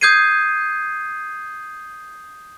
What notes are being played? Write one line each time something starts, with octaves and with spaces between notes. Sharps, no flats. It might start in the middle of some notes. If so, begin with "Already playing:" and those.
D#6 G6 G#6 C7 D#7